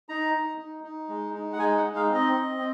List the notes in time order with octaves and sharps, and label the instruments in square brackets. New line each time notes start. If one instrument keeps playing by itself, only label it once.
[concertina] D#4 A#5
D#4
D#4
D#4
G#3
D#4
F#5
G#3 G#5
F#5
D#4
F5
C4
D#5
C4
C4